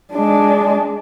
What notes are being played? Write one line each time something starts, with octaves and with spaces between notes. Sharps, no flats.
G#3 D4